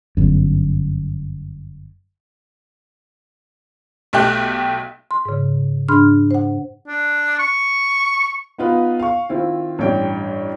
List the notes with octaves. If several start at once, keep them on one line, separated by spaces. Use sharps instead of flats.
G1 F#2
B1 A3 G4 F#6
C6
G#2 C#3
G#2 D4 B5 C6 F6
C5 F#5
D4
C#6
B3 D#4 F4 B4
F5 C#6
D#3 C4 E4 F4
A1 G2 C#5 G5